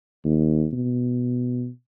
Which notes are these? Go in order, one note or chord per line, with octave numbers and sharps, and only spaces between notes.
D#2
B2